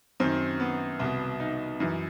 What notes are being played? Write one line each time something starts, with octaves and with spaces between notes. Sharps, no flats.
F#2 D#3 C4
B3
C2 B2
D#4
F#2 E3